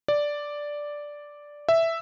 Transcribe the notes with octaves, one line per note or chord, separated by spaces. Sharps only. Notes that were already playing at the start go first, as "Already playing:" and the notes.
D5
E5